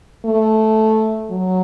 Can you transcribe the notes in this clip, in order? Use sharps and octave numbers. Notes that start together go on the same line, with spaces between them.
A3
F#3